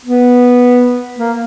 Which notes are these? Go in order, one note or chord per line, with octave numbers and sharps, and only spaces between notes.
B3
A#3